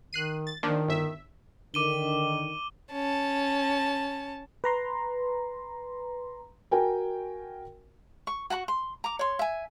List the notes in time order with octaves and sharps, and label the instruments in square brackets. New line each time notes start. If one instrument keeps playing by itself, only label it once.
[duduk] D#3 [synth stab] F#6 C7 D#7
[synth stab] A6
[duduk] D#3 [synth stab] F3 A#3 D4
[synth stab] G1 E5
[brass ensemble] D3 D#3 [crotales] D6 D#7 G7
[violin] C#4 A5
[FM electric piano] B4 A#5 C6
[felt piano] F#4 A#4 G5 G#5
[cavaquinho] C#6
F#4 F#5 A#5 C#6
C6
A#5 D6
C#5 C6
E5 G#5